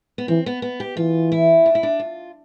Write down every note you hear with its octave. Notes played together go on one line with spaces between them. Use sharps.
B3
E3 C4
B3
B3
G4
E3 F4
E4
D4
E4
D4
F4